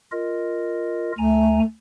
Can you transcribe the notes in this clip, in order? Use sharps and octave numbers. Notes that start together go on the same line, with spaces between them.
F4 A#4 D#5
D2 A3 G#5 A#5